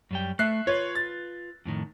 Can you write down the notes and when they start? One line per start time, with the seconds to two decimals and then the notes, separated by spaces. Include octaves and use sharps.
0.11 F#2 G3 G5
0.39 A3 E5 F#6 C7
0.67 F4 B4 C#5
0.95 A6
1.65 F2 A2 D#3